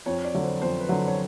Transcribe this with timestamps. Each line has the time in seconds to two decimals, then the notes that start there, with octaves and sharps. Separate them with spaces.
0.06 F2 C#5
0.25 D5
0.34 D3 F#3
0.43 C5
0.62 F2 C5
0.80 B4
0.89 D3 F#3
1.08 C#5